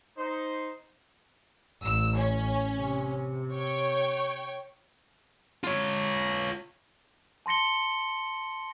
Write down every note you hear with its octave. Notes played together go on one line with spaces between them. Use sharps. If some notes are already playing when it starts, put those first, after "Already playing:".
D#4 C5
A1 E6
C#4
C3
C#5 G5 C#6
F4 C#5
A5 C6 A#6 C#7 G7